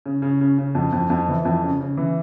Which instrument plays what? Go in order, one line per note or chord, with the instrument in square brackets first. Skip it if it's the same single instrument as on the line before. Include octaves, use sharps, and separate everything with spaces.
[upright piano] C#3
C#3
C#3
C#3
F2
F2
F2
E3
F2
C#3
C#3
E3